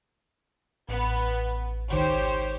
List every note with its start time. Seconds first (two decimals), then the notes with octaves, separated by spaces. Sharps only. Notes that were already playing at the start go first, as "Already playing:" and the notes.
0.89 A1 B3
1.91 G#1 C#2 D#3 G4 C5 C#5